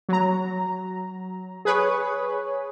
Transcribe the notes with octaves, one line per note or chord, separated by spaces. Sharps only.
F#3 A#5
G#4 B4 C#5